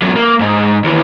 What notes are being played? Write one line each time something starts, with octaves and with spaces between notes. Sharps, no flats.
E2 F#3
A#3
G#2 D#4
D#2 E3